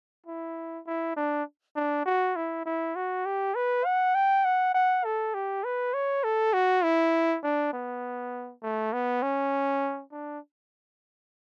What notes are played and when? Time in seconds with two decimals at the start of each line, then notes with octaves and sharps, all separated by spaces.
0.27 E4
0.87 E4
1.16 D4
1.76 D4
2.06 F#4
2.36 E4
2.66 E4
2.96 F#4
3.26 G4
3.55 B4
3.85 F#5
4.15 G5
4.45 F#5
4.74 F#5
5.05 A4
5.34 G4
5.64 B4
5.94 C#5
6.24 A4
6.54 F#4
6.84 E4
7.43 D4
7.73 B3
8.63 A3
8.93 B3
9.23 C#4
10.12 D4